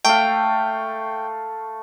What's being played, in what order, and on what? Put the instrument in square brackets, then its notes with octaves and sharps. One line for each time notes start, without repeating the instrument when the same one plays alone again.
[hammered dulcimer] A3 F5 [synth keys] G5